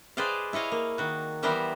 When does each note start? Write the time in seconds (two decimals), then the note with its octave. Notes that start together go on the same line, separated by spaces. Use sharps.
0.17 G#4 B4 C5 D5 D#5 F5
0.53 E4 C#5 D#5 F5
0.72 A#3
0.98 D#3 F#4
1.43 E3 G3 B3 A#4 C5 E5